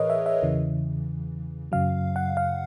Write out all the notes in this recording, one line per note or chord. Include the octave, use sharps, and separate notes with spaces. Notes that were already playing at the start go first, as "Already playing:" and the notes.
Already playing: A2 E3 G#4 A#4 B4 C#5 D#5
E5
E5
E2 C#3 E3
F#2 C#3 F#3 F5
F#5
F5